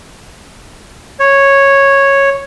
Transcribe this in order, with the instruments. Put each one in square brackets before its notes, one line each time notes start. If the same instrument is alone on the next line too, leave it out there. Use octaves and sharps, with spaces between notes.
[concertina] C#5